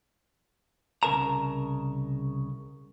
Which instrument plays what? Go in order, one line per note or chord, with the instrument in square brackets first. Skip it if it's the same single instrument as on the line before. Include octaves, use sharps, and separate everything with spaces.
[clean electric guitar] C2 C#3 E4 A#4 A5 A#5